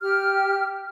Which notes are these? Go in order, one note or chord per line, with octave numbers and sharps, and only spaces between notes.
G4 F6